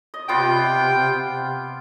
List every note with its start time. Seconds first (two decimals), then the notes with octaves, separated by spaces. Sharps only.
0.14 D#5
0.29 C3 B3 F4 D5 G5